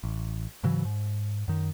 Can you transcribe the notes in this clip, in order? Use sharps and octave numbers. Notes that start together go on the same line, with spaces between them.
A1
G#2 C#3 E3 F#3
G#2
F#2 D#3